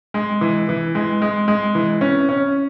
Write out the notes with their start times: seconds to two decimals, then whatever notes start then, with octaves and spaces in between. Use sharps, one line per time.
0.14 G#3
0.41 E3
0.69 E3
0.95 G#3
1.22 G#3
1.48 G#3
1.75 E3
2.01 C#4
2.29 C#4